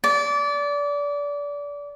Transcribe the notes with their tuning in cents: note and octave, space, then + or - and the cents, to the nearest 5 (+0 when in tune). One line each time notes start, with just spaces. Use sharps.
D5 -25